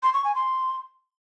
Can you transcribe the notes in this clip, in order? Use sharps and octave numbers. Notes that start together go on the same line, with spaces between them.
C6
C#6
G#5
C6